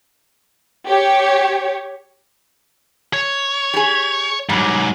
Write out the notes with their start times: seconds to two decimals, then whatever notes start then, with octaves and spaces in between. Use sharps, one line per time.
0.87 G4 C#5
3.13 C#5
3.74 G4 G#4
4.49 G#2 F#3 G3